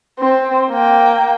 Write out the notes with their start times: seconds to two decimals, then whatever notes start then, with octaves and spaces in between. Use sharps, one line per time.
0.19 C4
0.70 A#3 G5